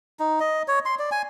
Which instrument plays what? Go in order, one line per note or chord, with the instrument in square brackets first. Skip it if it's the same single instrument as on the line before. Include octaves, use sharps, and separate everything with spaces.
[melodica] D#4
D#5
C#5
C6
D5
G#5